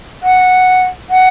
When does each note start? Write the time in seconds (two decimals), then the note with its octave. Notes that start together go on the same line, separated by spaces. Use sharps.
0.23 F#5
1.10 F#5